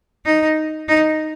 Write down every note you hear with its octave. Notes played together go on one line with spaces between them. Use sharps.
D#4
D#4